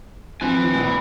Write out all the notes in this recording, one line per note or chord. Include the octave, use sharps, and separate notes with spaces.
F3 C4 B4 G#5 F#6
A#1 B5